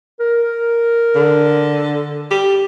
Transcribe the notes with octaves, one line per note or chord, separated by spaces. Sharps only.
A#4
D3
G4